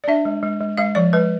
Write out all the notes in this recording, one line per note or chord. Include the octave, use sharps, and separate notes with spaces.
D5
D4 E5
G#3
G#3
G#3
G#3 F5
F3 D5
G#3 B4